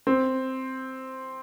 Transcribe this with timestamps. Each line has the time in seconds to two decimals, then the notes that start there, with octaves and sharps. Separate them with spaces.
0.07 C4